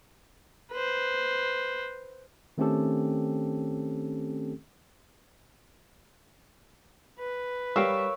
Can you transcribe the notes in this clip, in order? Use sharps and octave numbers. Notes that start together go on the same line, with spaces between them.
B4 C5
D#3 A3 C4 C#4 G4 A4
B4
G3 A#4 C#5 F5 G5 E6